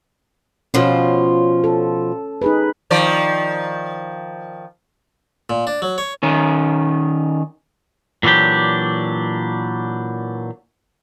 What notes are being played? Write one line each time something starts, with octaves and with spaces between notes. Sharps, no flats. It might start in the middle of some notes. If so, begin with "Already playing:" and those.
B2 F3 C#4 F4
A4
D#4 G#4 B4
D#3 F3 D5
A#2
D4
F#3
C#5
D#3 C#4
A#2 E3 F#3 D4 G4